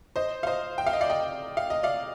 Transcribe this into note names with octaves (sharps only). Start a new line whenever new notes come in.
C5 D#5
F5
C5 D#5
G5
F5
D#5
D5 F5
D#5 G5
F5
D#5
D5 F5